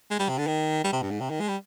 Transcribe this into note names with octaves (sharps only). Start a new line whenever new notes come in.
G#3
G3
C3
D3
D#3
G3
C3
G2
G#2
C3
D#3
G#3
G3